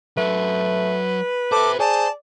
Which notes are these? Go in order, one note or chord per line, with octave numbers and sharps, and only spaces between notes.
F#3 A3 B4 E5
A4 C5 E5 D6
G#4 C5 D5 A5